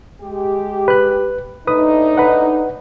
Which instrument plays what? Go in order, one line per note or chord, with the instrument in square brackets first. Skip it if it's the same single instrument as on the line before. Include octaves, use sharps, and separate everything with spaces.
[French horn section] G#3 G4
[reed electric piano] B4 F#6
[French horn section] A2 D4 D#4 [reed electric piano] B4 D#6
[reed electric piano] B4 F#5